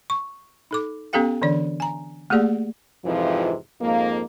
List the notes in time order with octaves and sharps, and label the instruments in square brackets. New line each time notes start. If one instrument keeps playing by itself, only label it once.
[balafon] C#6
D#4 A4 D6
B3 C#4 G4 A4 F5 G5
D3 E3 D4 D5
G#5 A#5
A3 A#3 G4 G#4 D5
[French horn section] F2 G#2 C3 E3 F3
F2 G#2 A#3